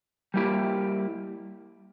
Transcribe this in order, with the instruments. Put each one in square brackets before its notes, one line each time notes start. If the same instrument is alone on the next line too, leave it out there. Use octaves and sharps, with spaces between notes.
[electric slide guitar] G3 A#3 E4 G4